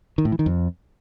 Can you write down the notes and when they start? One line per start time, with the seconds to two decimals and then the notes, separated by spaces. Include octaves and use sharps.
0.18 D#3
0.25 A2
0.32 E3
0.39 D#3
0.46 F2